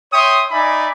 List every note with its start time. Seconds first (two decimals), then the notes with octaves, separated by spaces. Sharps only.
0.12 C#5 E5 G5 C6 D#6
0.51 D#4 D5 E5 G#5 B5